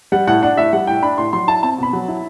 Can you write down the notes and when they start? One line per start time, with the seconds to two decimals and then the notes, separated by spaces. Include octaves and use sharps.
0.12 G3 F#5
0.27 A2 F#5
0.43 D4 F#5
0.57 A2 E5
0.73 G3 F#5
0.87 A2 G5
1.02 D4 B5
1.18 A2 C6
1.33 F#3 C6
1.48 E4 A5
1.63 C4 A5
1.78 B2 B5
1.93 F#3
2.08 E4